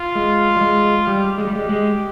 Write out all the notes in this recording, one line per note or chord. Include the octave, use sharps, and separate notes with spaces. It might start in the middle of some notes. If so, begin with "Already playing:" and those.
Already playing: F4
G#3
G3
G#3
G3 G4
G#3
G3
G#3
G#3